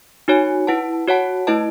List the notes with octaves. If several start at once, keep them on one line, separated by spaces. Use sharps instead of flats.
D#4 F#4 C#5 G#5
E4 B4 F#5 A5
F#4 C#5 F#5 A5
A3 E4 B4 D#5 A5